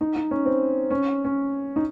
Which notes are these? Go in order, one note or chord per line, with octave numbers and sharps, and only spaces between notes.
D#4
D#4
C#4
C4
C#4
C#4
D#4